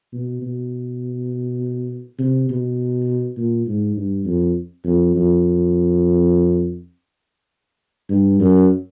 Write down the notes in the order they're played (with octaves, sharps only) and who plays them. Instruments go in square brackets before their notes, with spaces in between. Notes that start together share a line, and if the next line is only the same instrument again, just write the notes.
[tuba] B2
B2
C3
B2
A#2
G#2
G2
F2
F2
F2
G2
F#2